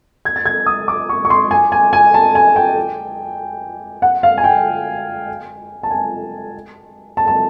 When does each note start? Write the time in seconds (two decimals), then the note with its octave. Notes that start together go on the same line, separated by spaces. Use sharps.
0.25 G#6
0.36 A6
0.46 G#6
0.66 D#6
0.88 D6
1.09 C#6
1.25 C#6
1.30 C6
1.51 G#5
1.72 G#5
1.93 G#5
2.14 A5
2.35 G#5
2.56 G5
4.02 F#5
4.23 F5
4.38 G#5
4.44 G5
5.83 A5
5.91 G#5
7.17 A5
7.27 A5